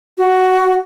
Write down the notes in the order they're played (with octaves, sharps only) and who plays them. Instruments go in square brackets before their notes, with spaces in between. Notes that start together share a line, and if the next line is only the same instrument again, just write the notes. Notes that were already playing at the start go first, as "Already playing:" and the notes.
[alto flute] F#4